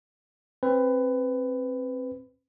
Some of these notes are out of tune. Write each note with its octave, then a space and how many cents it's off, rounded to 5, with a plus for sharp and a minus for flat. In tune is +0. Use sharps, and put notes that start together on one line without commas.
C4 +20 B4 +20